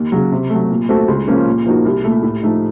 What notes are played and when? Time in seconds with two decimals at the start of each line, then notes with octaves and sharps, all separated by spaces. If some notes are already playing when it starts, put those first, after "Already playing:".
Already playing: D#2
0.12 C#3 F#3
0.32 C3
0.50 F#3 A3
0.70 A#2
0.89 A3 C4 F#4 A4
1.08 C#2
1.28 C#3 F3 A#3 C#4
1.46 A#2
1.66 F3 A#3 D#4 F#4
1.85 C2
2.04 A#2 A3
2.23 A2
2.43 F3 A3 D#4